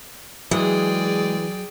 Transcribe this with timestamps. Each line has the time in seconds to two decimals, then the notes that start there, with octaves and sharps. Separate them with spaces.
0.51 E3 F#3 G#3 G#4 D5 G5